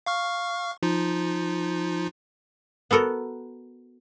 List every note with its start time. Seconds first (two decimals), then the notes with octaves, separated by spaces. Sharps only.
0.06 F5 C#6 F6
0.83 F3 D#4 F4
2.91 B3 F#4 A4 A#4